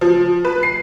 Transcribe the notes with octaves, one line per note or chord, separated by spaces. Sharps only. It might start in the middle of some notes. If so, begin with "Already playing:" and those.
F3
B4
C7